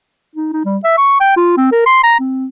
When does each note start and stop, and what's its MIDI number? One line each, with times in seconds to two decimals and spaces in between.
0.36 0.50 63
0.53 0.65 63
0.65 0.78 55
0.84 0.94 76
0.98 1.16 85
1.21 1.33 79
1.37 1.54 65
1.57 1.72 60
1.72 1.84 70
1.86 2.02 84
2.04 2.16 82
2.20 2.46 60